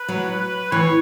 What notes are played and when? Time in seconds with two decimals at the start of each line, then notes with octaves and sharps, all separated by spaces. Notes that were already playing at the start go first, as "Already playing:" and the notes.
Already playing: B4
0.08 F#3
0.72 E3 C#5